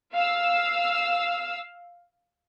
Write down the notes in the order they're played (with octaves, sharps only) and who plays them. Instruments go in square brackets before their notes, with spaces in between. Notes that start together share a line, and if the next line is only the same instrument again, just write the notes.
[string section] F5 E6